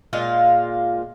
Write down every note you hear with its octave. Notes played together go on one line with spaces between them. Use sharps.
A#2 G#3 F4